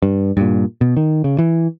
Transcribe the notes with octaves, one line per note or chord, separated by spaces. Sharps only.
G2
G2 A#2
B2
D#3
C#3
E3